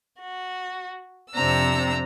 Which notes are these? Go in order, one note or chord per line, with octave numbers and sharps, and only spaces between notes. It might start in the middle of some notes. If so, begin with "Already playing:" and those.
F#4
F2 C3 C4 D4 A#5 E6